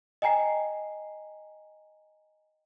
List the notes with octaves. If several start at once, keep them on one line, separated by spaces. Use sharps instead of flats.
D#5 G5 G#5 A#5 C7